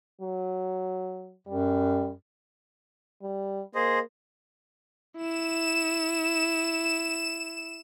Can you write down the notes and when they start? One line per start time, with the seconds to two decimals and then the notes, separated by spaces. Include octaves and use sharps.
0.21 F#3
1.47 F#2 G3
3.22 G3
3.75 A#3 G#4 C5 D#5
5.18 E4 E7